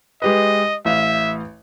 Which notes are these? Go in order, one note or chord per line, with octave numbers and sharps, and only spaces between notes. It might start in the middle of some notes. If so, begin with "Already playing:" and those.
G#3 G4 B4 D#5
A1 E5 F5